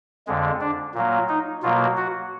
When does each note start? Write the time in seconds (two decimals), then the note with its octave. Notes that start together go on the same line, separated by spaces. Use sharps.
0.27 F2 D3 G#3
0.61 D4
0.95 A#2 F#3 A#3
1.29 D#4
1.63 B2 F#3 A#3 F4
1.97 F#4